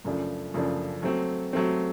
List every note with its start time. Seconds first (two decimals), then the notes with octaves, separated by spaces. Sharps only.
0.04 F#2 C#3 F3 A3 D4
0.54 F#2 C#3 F3 A3 D4
1.03 F#3 A3 C4
1.53 F#3 A3 C4